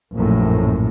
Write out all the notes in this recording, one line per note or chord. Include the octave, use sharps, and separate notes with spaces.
A#1 F#2 A2